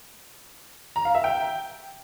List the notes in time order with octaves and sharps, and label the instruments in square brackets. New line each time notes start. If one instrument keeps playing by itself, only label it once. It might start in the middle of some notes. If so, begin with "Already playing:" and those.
[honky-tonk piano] A#5
F5
E5
G5